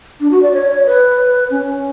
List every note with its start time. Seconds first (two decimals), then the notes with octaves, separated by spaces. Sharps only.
0.20 D4
0.31 F#4
0.42 D5
0.53 C#5
0.70 C#5
0.85 B4
1.50 C#4